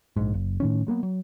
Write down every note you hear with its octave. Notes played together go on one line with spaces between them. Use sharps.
A#1 G#2
F#1
A2 D#3 C#4
F#3 G#3 A#3 B3
F#3